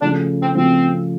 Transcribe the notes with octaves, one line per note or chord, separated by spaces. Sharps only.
C#3 F3 A3 D4
C4
C#3 F3 A3 C4